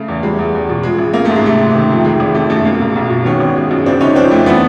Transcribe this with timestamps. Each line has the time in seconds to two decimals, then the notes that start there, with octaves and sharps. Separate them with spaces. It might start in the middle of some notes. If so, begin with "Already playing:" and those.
Already playing: C#3 A3
0.08 E2
0.23 G3 G#3
0.39 E2
0.54 E2
0.69 B2
0.83 F3 G#3
0.98 A1
1.13 A1 A#3
1.25 G#2 A3
1.36 G#3
1.44 C3 A3
1.59 F#1
1.74 D#3
1.90 F2
2.04 D#3 G#3
2.20 G#1
2.34 G#1 A3
2.50 F#2 A3
2.65 G#3 A#3
2.80 B1
2.96 B1
3.10 B2
3.25 D#3 B3 C#4
3.40 G#1
3.56 G#3
3.71 F#2
3.86 C#3 C4 D4
4.01 G1 C#4 D#4
4.16 F3 C4 D4
4.31 F2 A3
4.46 E3 A3 B3